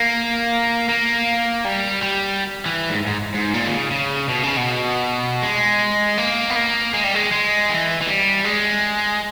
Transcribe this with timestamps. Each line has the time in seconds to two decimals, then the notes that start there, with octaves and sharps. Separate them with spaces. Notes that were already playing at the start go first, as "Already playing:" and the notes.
Already playing: A#3
0.89 A#3
1.65 G3
2.03 G3
2.66 E3
2.90 G#2
3.06 G#2
3.34 G#2
3.54 A#2
3.66 D#3
3.72 C#3
3.91 C#3
4.29 B2
4.43 C#3
4.57 B2
5.43 G#3
6.18 A#3
6.50 B3
6.56 A#3
6.94 G#3
7.04 G3
7.15 G#3
7.32 G#3
7.69 E3
8.02 E3
8.07 G3
8.45 G#3